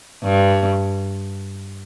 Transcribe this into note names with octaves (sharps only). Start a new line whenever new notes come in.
G2